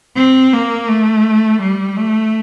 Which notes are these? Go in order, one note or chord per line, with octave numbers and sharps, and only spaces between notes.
C4
A#3
A3
G3
A3